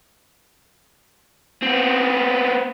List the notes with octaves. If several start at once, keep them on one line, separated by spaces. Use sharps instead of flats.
B3 C4